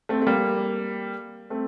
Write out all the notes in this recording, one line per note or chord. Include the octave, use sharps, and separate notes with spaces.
A3 C4
A3
G3 A#3
A3 C4